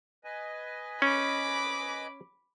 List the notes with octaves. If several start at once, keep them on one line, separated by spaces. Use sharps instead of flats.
B4 D#5 G#5
C#4 B5 D6